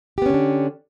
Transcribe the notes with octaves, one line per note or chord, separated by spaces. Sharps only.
D3 B3 C#4 D4 G4